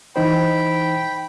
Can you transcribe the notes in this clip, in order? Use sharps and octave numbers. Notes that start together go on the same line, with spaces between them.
E3 D#4 C5 G5 B5